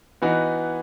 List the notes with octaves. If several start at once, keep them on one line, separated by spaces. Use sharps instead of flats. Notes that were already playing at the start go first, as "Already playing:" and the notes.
E3 B3 D#4 F#4